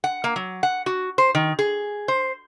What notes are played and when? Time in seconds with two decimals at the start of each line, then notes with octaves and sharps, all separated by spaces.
0.04 F#5
0.24 A#3
0.36 F#3
0.63 F#5
0.86 F#4
1.18 C5
1.35 D#3
1.59 G#4
2.08 C5